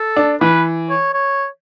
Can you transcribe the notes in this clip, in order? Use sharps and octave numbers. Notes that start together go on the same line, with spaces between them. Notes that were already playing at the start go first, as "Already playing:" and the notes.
Already playing: A4
D4
E3 B4
C#5
C#5